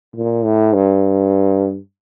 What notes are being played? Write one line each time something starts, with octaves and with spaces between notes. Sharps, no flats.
A#2
A2
G2